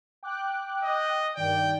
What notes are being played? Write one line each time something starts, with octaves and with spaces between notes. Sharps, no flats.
G5 D6 F#6
D#5
G2 D#3 D5 G5